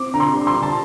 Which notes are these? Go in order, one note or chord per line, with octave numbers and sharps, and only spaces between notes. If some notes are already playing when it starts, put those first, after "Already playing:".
Already playing: C4 D6
D3 A#5
C6
G3
C6
D3
A5